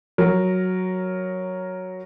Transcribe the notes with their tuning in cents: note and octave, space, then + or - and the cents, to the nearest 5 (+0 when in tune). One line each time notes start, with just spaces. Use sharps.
F#3 +0 A#4 +0